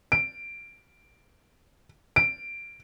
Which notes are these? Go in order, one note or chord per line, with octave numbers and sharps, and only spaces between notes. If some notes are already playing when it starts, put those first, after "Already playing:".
D7
D7